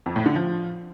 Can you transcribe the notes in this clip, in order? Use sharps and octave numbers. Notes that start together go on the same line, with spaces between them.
F2
A2
D3
F3